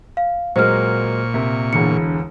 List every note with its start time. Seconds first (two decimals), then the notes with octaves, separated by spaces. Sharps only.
0.17 F5
0.56 A#2 F#3 G#3 A#3 C5 C#6 F6
1.34 C3 A#4
1.73 E1 E2 D3 C#7